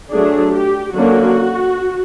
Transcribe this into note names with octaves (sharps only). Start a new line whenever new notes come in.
F#3 A3 D4 G#4
G4
D3 F#3 A#3 C#4 F#4